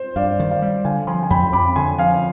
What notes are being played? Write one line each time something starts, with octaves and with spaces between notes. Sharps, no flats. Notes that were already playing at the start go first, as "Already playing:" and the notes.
Already playing: C5
G2 D5 F5
D#3
D5 F5
G3
D3 F5 G#5
F3 G#5 C6
G#5
F2 G5 B5
F2 B5 D6
D3 G#5 C6
F3 F5 G#5